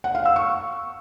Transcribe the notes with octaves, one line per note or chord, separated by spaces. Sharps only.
F#5
F5
E6
C#6